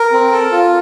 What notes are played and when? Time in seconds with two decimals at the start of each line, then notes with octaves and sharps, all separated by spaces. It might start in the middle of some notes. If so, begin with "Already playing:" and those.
Already playing: A#4
0.12 C4
0.32 A4
0.52 F4